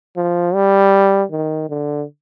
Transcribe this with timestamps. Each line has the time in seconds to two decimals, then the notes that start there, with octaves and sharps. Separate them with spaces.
0.16 F3
0.54 G3
1.31 D#3
1.70 D3